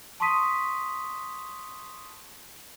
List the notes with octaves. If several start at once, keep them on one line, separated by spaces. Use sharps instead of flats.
A5 C6 C#6 D#6 B6 D#7